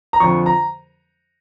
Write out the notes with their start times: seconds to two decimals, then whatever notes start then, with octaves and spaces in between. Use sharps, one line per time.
0.13 A#5
0.20 F2 D3 F3 C#6
0.46 A#5